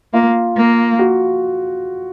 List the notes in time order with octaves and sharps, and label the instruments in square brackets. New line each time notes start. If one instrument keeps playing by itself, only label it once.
[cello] A#3 [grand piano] F4
[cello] A#3
[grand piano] F#4